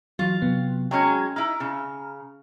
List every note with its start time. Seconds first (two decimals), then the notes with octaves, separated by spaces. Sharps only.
0.19 E3 F#3 F4
0.42 C3 F#3 B3
0.91 F#3 G#3 C#4 G5 G#5 G#6
1.36 D#4 E4 A#5 F6
1.60 C#3